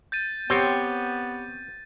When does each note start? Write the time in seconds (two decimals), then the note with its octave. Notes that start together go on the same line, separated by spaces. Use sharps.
0.12 G6 A6 D#7
0.50 B3 C4 G4 C#5